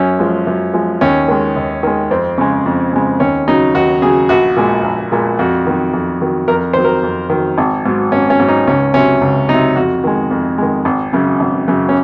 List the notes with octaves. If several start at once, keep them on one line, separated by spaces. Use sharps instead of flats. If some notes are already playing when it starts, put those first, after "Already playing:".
Already playing: F#2 C#4
F3 G#3
F#2
F3 G#3
D#2 C#4
D#3 G#3
D#2
D#3 G#3
F2 C4
C#3 G#3
F2
C#3 G#3
D#2 C#4
C#3 F#3 D#4
D#2 F#4
C#3 F#3 G#4
A#1 F#4
A#2 G#3
A#1
A#2 G#3
F2 F#4
D#3 F#3
F2
D#3 F#3
F2 A#4
D#3 F#3 C5
A#4
F2
D#3 F#3
G#1
G#2 F#3
G#1 C#4
C#4
G#2 F#3
D#4
C#2 C#4
C3 F#3 C#4
C#2
C3 F#3 D#4
F2 F#4
D#3 G#3
F2
D#3 G#3
G#1
F#2 C#3
G#1
F#2 C#3
C#4